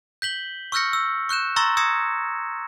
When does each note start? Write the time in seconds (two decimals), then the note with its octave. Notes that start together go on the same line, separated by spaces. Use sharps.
0.22 G6 B6 F#7 G7
0.72 C#6 E6 F6 G6 A#6 C#7
0.93 E6
1.29 C#6 F#6 G6 E7
1.56 A#5 C6 C#6 E6 A6 A#6
1.77 D#6 E6 G#6 A#6 C#7 E7